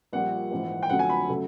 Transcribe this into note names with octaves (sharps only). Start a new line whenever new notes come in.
A#1 A#2 G3 F#5
A#1 G#2 E3
G5
F2 D3 F#3 A3 F#5
G#5
B5
C#3 F#3 A3